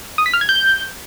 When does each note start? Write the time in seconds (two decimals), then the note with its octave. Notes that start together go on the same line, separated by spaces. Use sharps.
0.18 D#6
0.26 B6
0.34 F6
0.41 G#6
0.49 G6